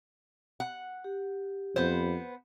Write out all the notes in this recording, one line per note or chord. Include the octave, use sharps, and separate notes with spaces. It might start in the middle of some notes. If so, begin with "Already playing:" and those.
F#5
G4
F2 B3 C5